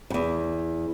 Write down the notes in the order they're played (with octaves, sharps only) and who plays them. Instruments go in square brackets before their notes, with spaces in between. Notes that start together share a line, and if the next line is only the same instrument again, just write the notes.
[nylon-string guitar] E2 G2